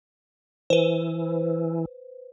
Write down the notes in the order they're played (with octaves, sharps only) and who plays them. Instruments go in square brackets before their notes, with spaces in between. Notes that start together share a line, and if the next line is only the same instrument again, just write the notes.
[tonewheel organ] E3 [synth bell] B4 C5